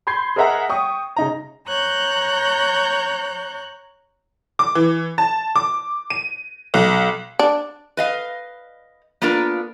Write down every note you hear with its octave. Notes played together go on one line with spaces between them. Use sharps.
B5 C6 G6 G#6 C7
G#4 A#4 D#5 E5 F#5 A#5
G5 C#6 D#6
C#3 D#4 A#5
C#5 A#5 F#6 G6
D6
E3
A5
D6
D#7
B1
D4
B4 D#5 F5
A#3 B3 D4 F4 A#4